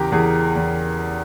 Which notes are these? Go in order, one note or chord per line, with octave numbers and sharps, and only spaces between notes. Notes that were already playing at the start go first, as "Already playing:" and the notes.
Already playing: E2 C#3 G4 A#4
E2 G#4
E2